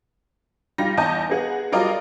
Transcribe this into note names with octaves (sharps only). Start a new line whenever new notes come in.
G3 D#4 F4 A#6
E2 D#5 G#5 A5 G6
B3 G#4 F#5
F#3 G3 F4 A#4 D5 D#5